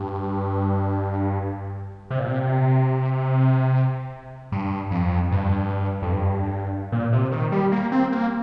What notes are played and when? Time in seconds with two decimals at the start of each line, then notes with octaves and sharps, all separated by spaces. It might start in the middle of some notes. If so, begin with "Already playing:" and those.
Already playing: G2
2.10 C3
2.19 A#2
2.28 C3
4.52 G2
4.91 F2
5.32 G2
6.02 F2
6.12 G2
6.92 A#2
7.12 C3
7.32 D#3
7.52 G3
7.72 A#3
7.92 C4
8.12 A#3